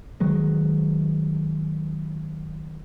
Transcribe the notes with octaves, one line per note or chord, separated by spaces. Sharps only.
D#3 F#3 G#3